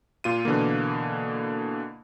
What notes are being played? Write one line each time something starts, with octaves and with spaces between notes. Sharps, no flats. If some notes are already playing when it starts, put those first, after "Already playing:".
A#2 F4 D#7
B2 D3 E3 A#3